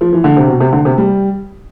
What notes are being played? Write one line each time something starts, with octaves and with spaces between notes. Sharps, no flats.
F3
E3
D3
C3
B2
C3
D3
C3
G3